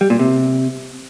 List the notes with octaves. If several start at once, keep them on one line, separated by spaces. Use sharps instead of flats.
G3
A#2
C3